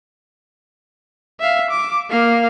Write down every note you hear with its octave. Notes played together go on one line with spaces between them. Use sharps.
E5 F5
D6
A#3 F5